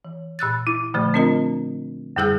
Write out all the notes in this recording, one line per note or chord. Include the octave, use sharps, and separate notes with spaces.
E3
A#2 E6 F#6 A6
E4
A#2 D3 F3 A3
C4 D4 F4 A#4 D#5 A#5
F#2 D3 G3 G#4 E6 G6